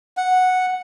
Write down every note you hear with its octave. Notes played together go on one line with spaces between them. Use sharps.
F#5